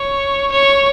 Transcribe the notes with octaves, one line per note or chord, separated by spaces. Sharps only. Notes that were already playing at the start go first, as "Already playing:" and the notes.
Already playing: C#5
C#5